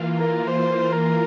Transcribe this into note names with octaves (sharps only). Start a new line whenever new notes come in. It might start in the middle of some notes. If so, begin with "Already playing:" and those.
Already playing: E3 A#3 F4
A#4
C5
A#4